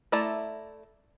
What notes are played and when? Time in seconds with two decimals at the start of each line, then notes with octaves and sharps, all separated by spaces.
0.12 A3 E4 D5 A5 A#5